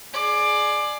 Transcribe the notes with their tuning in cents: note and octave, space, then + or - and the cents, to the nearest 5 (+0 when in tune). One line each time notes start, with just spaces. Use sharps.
G#4 +15 D5 +20